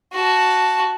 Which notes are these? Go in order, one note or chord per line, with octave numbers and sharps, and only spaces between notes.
F#4 A5